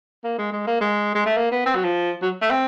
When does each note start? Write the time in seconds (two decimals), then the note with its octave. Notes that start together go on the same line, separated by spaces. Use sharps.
0.24 A#3
0.38 G#3
0.53 G#3
0.67 A#3
0.81 G#3
1.15 G#3
1.26 A3
1.37 A#3
1.52 B3
1.66 C4
1.75 F#3
1.84 F3
2.22 F#3
2.41 A3
2.51 C4